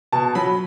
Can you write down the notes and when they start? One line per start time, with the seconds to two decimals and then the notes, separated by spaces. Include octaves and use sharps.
0.12 B2 A5
0.35 F#3 B5